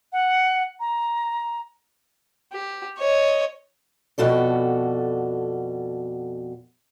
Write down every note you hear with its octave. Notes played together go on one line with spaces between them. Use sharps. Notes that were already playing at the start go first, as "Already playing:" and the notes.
F#5
A#5
G4
C#5 D#5
F2 B2 F#4 A4 D5